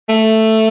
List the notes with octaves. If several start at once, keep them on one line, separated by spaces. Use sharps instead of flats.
A3